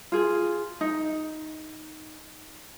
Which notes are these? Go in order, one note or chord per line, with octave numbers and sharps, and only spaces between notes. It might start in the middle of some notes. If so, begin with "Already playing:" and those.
F4 G#4
D#4